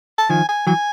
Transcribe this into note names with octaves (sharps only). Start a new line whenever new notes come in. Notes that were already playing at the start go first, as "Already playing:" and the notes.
A5
D#3 F3 G#5
G#5
E3 F#3 G#5